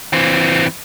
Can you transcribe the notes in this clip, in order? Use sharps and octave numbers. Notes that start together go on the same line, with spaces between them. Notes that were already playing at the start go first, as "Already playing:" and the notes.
E3 C4